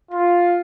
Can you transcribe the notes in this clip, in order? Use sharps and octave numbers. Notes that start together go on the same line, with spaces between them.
F4